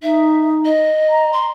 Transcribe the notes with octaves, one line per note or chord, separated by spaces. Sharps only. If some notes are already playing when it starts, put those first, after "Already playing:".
D#4 E5
D#5
A#5
C6